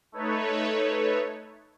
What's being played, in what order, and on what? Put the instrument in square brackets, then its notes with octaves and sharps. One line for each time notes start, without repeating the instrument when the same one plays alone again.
[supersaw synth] A3 D#4 A4 B4 C#5